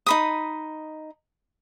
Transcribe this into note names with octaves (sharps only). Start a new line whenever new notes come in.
D#4 B5 D#6